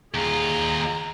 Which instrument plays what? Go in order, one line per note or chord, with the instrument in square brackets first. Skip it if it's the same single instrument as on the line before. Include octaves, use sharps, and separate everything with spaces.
[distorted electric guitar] D#2 F4 [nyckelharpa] G#4 [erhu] A#5